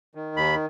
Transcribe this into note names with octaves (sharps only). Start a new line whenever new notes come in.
D#3
D#2 B5